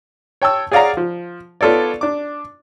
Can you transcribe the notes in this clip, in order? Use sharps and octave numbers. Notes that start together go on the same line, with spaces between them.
C#5 G5 A5 E6
G#4 C#5 D5 F5 F#5 A#5
F3
B3 F4 A4 C#5 D5
D4 D6